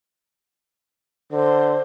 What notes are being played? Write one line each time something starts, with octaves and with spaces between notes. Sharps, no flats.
D3 C5